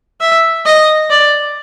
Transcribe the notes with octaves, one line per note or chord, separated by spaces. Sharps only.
E5
D#5
D5